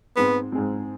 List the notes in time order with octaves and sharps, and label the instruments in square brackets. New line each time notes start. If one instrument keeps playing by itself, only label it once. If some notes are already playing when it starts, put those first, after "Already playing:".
[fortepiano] G#2 G#3 C4 [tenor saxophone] B3
[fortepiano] G#2 G#3 C4